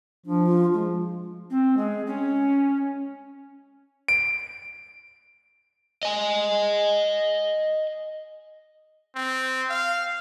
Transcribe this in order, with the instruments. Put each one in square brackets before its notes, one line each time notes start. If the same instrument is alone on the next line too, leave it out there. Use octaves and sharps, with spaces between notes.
[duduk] F3 [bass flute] D4
[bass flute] F4
G#3
[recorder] C4
G#3
C#4
[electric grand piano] D7
[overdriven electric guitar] D#5 G#5
[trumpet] C4
F5